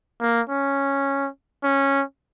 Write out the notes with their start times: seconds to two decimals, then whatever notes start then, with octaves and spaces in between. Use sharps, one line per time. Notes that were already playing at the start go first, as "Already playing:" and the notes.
0.21 A#3
0.49 C#4
1.64 C#4